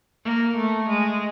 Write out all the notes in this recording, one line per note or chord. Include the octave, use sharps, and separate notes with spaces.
A#3
A3
G#3